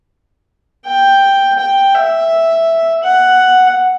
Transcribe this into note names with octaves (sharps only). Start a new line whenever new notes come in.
G5
G5
E5
F#5